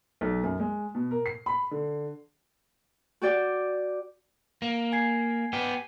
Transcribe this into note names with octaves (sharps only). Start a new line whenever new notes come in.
B1
F#2
G#3
B2
A#4
C7
B5
D3
F#4 G4 D5 G5
A#3
G#5 G#6 C7
B3 G4